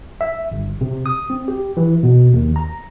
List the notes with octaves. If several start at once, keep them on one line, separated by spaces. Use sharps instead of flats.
E5
G1
C3
D#6
C4
G4
E3
B2
D#2
A#5